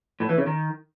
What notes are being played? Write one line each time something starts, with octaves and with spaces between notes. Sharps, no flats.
A2
E3
C#3
D#3